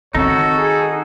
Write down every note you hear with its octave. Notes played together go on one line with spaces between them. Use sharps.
D#3 C4 D#4 F#4 A4 C#5
G#4